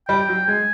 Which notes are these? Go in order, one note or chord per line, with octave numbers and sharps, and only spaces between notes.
G3 G5
F#3
G#3 G#5